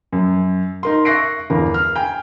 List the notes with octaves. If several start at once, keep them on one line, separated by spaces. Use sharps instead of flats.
F#2
D#4 A#4 C6
E5 C#6 F#6 A#6 C7 D7
G1 E2 A#4
F6
G5 G#5